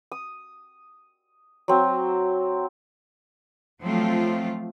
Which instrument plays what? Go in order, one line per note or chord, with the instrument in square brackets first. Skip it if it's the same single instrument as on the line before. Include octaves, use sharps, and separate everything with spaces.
[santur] D#6
F#3 C4
[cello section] F3 F#3 A3 C4 F4